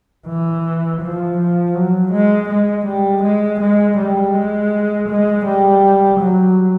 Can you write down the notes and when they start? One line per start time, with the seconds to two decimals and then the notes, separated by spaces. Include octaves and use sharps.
0.27 E3
1.02 F3
1.38 F3
1.75 F#3
2.12 G#3
2.49 G#3
2.86 G3
3.23 G#3
3.60 G#3
3.97 G3
4.34 G#3
5.08 G#3
5.45 G3
6.20 F#3